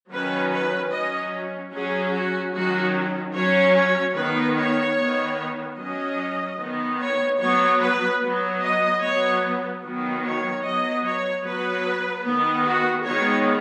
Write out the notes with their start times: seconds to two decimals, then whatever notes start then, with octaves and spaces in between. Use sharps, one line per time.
0.11 D#3 F#3 C#4 B4
0.52 B4
0.92 F#3 C#4 D#5
1.73 F#3 C#4 G#4
2.14 F#4
2.54 D#3 F#3 C#4 F#4
3.35 F#3 C#4 C#5
3.75 C#5
4.15 D#3 B3 B4
4.57 C#5
4.97 D#3 B3
5.77 F#3 C#4 D#5
6.59 D#3 B3
6.99 C#5
7.39 F#3 B3 C#5
7.80 B4
8.20 F#3 B3
8.62 D#5
9.02 F#3 B3 C#5
9.83 D#3 F#3 B3
10.23 C#5
10.64 F#3 B3 D#5
11.04 C#5
11.44 F#3 B3 B4
12.25 D#3 B3
12.66 F#4
13.06 D#3 G#3 B3 C#5